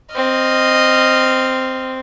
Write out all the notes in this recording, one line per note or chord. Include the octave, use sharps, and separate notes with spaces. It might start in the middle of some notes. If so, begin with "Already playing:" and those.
C4 D#5 F6